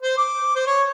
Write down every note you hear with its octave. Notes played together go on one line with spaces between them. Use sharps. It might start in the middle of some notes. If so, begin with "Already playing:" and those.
C5
D6
C5
C#5